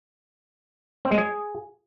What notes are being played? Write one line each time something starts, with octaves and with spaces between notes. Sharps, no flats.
C4
G#3
G#4